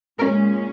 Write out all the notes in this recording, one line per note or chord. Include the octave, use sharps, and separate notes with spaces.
A#2 G#3 C#4 A#4